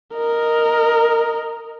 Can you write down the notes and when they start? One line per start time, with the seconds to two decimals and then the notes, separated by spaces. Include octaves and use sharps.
0.15 A#4 D#5